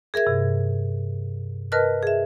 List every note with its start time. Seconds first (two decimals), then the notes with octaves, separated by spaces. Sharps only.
0.14 G#4 A#4 E5 G#6
0.27 G2 C3
1.72 A#4 B4 D#5 A5 F6 F#6
2.03 G#4 E5